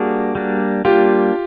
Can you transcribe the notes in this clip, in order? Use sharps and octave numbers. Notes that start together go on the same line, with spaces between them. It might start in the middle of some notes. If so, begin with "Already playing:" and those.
Already playing: G3 A#3 D4 F#4 G#4
G3 A#3 D4
G3 A#3 D4 F4 G4